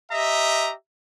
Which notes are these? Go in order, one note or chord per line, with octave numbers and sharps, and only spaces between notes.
G4 D#5 E5 A#5